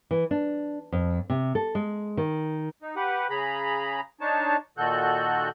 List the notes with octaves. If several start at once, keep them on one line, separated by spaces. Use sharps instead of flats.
E3
D4
F2
C3
A4
G#3
D#3
D#4
G4 B4 F#5
C#3 G#4 A#5 B5
D4 D#4 C#5 A5
A#2 D#3 F#4 A4 F#6 G6